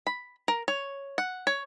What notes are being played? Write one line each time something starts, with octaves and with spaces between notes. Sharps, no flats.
B5
A#4
C#5
F#5
C#5